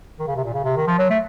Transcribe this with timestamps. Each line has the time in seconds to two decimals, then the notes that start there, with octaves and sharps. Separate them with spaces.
0.19 D#3
0.27 C#3
0.36 C3
0.44 A#2
0.54 C#3
0.64 C3
0.76 D#3
0.87 F3
0.99 F#3
1.10 A3